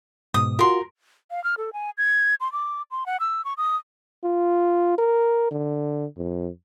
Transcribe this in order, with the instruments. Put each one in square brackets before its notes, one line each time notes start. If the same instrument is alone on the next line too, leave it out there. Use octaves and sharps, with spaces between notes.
[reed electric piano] G#2 B2 [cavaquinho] D#6
[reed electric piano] F4 F#4 [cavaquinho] A#4 C6
[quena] F5
F6
A4
G#5
G#6
C6
D6
C6
F#5
E6
C#6
D#6
[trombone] F4
A#4
D3
F2